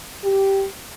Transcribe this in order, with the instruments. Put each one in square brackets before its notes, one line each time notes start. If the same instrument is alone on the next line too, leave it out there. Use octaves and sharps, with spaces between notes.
[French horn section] G4